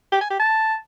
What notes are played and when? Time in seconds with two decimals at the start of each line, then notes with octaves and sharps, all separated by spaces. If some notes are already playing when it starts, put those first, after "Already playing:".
0.12 G4
0.21 G#5
0.30 G4
0.39 A5